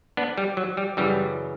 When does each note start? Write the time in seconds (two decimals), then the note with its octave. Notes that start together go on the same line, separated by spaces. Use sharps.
0.17 B3 D4
0.38 G3
0.57 F#3
0.77 G3
0.97 F#2 C#3 E3 G3